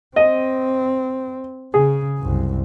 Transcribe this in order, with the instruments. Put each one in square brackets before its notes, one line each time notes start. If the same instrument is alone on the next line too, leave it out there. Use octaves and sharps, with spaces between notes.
[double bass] C4 [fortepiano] D#5
[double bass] C#3 [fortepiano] G#4
[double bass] C2 F#2